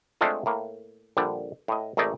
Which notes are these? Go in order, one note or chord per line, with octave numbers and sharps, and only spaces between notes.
G#3 A3 C4 D4 F4 A4
A2 A#3
A#1 D3 G3 D5
A2 D#5
G#1 A3 D#4 G#4 D5